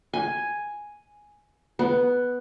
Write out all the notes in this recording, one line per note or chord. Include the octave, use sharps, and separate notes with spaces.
G#5
B3